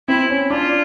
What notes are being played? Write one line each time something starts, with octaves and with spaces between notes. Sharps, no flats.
C4 E4
C#4
D4 F4